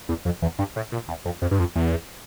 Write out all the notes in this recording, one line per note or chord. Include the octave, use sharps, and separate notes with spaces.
E2
F2
E2
G2
A2
A#2
E2
F2
F2
G2
F2
E2